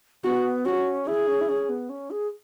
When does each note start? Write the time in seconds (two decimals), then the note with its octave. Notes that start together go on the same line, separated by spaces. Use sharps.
0.24 B3 F#4
0.65 C#4 F#4
1.07 E4 G#4
1.28 C#4
1.41 E4
1.49 C#4
1.69 B3
1.90 C#4
2.11 G#4